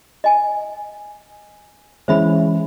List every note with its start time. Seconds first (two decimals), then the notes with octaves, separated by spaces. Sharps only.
0.24 D#5 G#5
2.08 E3 G#3 C#4 C5 E5 B5